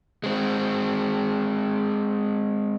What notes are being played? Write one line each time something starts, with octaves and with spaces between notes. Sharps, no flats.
G#3 C4